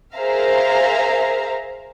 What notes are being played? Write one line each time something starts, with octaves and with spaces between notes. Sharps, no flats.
G#4 A#4 C5 E5 F5 A#5